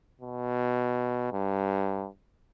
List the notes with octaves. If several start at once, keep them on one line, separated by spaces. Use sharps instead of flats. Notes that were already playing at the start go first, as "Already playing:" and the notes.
B2
G2